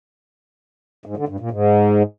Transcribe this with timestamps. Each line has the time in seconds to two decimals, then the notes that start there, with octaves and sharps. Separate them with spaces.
1.06 G#2
1.17 D3
1.28 G2
1.40 A#2
1.51 G#2